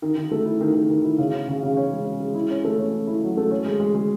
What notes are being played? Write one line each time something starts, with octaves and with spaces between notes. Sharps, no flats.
D#3
D#3
A3
E4
D#3
D#3
D#3
E4
C#3
C#4
C#3
C#3
C#4
G#3
C#4
G#3
E4
C#4
A3
C#4
C#4
E4
F#3
A3
C#4
G#3
G#3
G#3